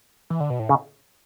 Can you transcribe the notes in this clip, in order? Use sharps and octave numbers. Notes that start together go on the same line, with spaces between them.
E3
D3
B2
A2
C#3